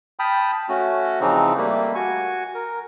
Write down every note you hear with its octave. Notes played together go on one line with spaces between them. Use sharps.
G5 A5 B5 D#6 F6
A3 C#4 F#4
C#3 E3 F3 C4 D#4
G3 A3 A#3
F#4 G#5 C#6
A#4